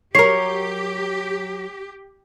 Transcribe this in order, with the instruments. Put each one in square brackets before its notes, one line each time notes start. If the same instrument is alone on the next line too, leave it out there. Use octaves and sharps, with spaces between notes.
[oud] F#3 A#4 [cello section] G4 [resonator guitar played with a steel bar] C#5 [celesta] C7